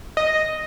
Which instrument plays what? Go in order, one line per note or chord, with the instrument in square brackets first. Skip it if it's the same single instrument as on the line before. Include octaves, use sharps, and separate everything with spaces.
[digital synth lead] D#5